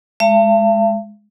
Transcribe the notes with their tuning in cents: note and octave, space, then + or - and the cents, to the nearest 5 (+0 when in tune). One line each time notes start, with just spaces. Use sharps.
G#3 +5 E5 +45 A5 +35